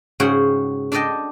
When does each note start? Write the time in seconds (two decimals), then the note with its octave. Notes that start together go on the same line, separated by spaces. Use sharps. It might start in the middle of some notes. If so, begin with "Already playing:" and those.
0.20 G#2 C#3 F#4 G#4 F#5 G5
0.92 D4 A4 D5 D#5 G5